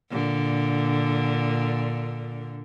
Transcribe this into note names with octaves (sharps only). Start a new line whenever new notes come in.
A#2 D3